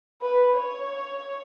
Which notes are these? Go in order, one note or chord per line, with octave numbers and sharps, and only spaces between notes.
B4
C#5